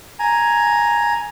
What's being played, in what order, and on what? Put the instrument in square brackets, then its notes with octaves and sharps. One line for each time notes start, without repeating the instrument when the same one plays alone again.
[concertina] G#5 A#5